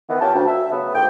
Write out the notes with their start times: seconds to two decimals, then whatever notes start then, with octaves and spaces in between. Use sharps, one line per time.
0.09 D#3 E3 B3
0.21 C#4 F4 G4 G5 A5
0.34 D2
0.47 E5
0.72 C#3 F#3 A3 B3
0.94 D2 G#2 A#3 G5